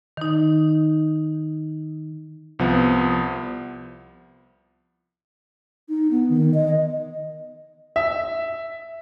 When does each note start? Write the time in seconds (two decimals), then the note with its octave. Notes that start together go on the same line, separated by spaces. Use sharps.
0.17 D#3 D#4
2.59 C2 F3 B3
5.89 D#4
6.11 B3
6.30 D#3
6.54 D#5
7.96 E5